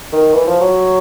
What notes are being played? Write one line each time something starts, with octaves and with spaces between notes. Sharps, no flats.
D#3
E3
F3
F#3